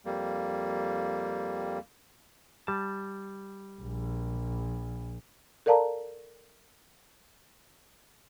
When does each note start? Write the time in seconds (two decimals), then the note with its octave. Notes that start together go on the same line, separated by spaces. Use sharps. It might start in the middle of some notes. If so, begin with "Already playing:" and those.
0.05 F2 G3 A#3
2.67 G3 A5
3.82 A#1
5.66 A4 A#4 D5 F5 A5 A#5